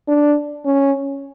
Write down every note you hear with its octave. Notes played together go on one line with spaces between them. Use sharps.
D4
C#4